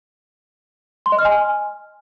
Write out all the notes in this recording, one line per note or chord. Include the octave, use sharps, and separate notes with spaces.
C6
D#5
F6
G#5